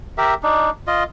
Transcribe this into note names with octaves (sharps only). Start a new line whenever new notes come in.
G4 A#4 E5
D4 D#4
F4 D#5